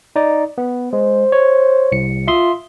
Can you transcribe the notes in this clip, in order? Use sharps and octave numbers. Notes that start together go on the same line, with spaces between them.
D#4 D5
B3
G#3 C5
C#5
C2 C#7
F4 E5 C6 D#6